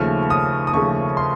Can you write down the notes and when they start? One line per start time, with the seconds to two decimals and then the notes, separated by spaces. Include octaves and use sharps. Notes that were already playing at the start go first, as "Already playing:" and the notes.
Already playing: D#2 C#3 F3 A3 F6
0.30 D#6
0.67 D#6
0.73 D#2 C#3 F3 A3 C#6
1.17 C6